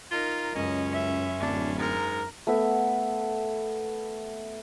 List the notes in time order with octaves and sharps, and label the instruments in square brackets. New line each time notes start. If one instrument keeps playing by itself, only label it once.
[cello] D#4 A#4 [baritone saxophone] F4
[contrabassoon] C#2 [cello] F#2 [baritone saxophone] C#4 [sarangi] D#5
[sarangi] E5
[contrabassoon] D1 [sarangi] D4
[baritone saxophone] G#2 [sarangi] A#4
[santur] A3 B3 E5